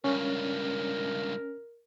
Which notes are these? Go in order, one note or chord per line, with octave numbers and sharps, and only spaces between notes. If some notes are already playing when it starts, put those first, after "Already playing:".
C#2 G2 C#4 A#4